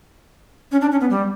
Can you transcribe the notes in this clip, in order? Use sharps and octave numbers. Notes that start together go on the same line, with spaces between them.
C#4
D4
C#4
B3
G3